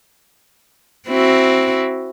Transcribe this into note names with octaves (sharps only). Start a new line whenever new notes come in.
C4 E4 F#4